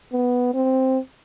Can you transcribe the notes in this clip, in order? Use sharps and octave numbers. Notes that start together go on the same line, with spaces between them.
B3
C4